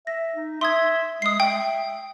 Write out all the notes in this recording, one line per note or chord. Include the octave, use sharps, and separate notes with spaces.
E5 A#6
D#4
E5 C6 D#6 G#6
G#3 D#6 C7
E5 G5